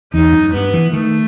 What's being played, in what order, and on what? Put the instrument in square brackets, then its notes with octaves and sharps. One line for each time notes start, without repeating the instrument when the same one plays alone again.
[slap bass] E2 [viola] D#4
[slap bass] F#2
[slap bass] G2 [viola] B3
[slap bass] E3
[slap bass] D#3 [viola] A3